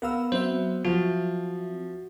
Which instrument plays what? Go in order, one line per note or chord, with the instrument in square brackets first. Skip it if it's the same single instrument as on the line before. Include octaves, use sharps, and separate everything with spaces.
[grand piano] B3 [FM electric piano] A#4 F5 E6
[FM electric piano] F#3 C4 E5 [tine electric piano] C5
[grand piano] F3 [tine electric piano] F#4